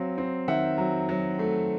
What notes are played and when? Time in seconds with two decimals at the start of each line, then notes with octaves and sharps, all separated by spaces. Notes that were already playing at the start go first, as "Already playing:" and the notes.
Already playing: F#3 C4 F5
0.18 C4
0.48 D#3 E5 F#5
0.78 F#3
1.09 F#3
1.39 A3